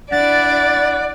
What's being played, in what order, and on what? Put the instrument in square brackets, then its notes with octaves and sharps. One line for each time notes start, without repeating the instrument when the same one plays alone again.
[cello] D4 E4 [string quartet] D5 [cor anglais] F#5 [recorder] A6